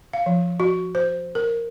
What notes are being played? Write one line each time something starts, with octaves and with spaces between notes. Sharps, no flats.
F5
F3
F#4
C5
A#4